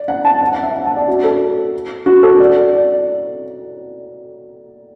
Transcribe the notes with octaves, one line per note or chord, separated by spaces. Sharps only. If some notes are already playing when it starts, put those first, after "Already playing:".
Already playing: D5
F#5
A5
F#5
F#5
E5
F#5
A5
D5
F#4
A4
F#4
A4
D5
D5